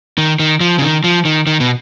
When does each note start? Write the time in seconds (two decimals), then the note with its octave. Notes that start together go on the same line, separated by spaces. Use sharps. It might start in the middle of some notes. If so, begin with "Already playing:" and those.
0.18 D#3
0.39 D#3
0.60 F3
0.78 C#3
0.82 D#3
1.04 F3
1.25 D#3
1.47 D#3
1.60 B2